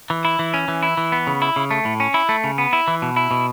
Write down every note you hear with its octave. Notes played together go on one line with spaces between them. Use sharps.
E3
E4
E3
C#4
E3
E4
E3
B3
C#3
E4
C#3
A3
A2
C#4
E4
A3
C#3
B3
E4
E3
B2
E4
B2